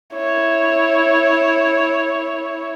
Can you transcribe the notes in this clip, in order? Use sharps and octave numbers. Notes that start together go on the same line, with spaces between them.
E4 C#5